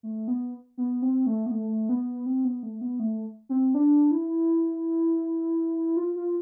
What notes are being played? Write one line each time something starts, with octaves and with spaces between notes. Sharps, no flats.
A3
B3
B3
C4
A3
B3
A3
B3
C4
B3
A3
B3
A3
C4
D4
E4
F4
F4